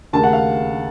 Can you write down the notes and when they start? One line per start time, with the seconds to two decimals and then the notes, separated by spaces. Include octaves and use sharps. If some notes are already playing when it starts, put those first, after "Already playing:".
0.13 D#2 C#3 A3 A5
0.23 F#5
0.33 F5